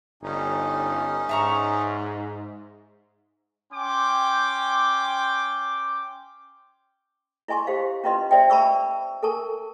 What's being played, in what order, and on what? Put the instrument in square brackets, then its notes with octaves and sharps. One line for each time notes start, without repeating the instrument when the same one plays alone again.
[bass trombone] G1 [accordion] C#4 D#4
[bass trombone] G#2 [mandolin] E5 A#5 C#6
[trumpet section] C#4 G5 C6 D6
[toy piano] E4 D#5 G#5 C6 C#6
G4 C5 F5
C#4 E4 F4 B4 D#5 C6
C5 D5 E5 G5
D4 A5 B5 C#6 E6
A4 A#4 G#5 A5 C#6